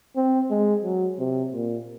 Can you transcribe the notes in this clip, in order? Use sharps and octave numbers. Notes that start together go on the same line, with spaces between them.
C4
G#3
F#3
C3
A#2